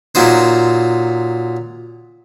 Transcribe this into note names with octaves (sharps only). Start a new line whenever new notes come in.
A#2 F#3 D#4 C5